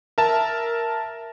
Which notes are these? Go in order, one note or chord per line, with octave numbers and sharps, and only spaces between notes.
A#4 E5 A5